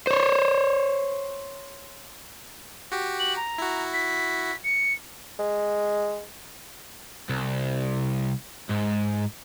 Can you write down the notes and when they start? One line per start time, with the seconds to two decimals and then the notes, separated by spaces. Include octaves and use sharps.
0.07 C5 C#5
2.92 F#4 G4
3.20 F#7
3.36 A#5
3.58 E4 F#4
3.94 B6
4.64 C#7
5.39 G#3
7.30 C2
8.70 G#2